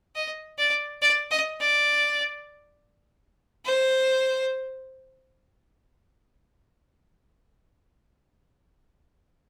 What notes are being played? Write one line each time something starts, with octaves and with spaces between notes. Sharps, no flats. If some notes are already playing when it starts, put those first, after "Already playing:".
D#5
D5
D5
D#5
D5
C5